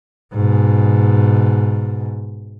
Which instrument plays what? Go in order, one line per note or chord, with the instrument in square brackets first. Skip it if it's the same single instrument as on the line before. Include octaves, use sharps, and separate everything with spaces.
[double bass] G#2 B2